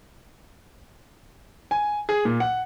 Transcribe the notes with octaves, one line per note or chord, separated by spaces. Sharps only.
G#5
G#4
A#2
F#5